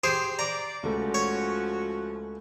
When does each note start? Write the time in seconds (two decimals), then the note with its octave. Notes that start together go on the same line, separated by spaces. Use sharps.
0.04 G4 G#4 C5
0.39 D5 A#5
0.83 C#2 F3 A3 C#4 F#4 G#5
1.14 C#5